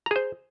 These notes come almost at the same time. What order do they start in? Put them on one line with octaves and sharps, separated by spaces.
A#5 G#4 C5